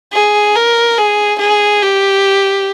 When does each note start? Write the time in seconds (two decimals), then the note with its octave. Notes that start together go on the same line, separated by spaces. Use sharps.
0.13 G#4
0.55 A#4
0.97 G#4
1.39 G#4
1.82 G4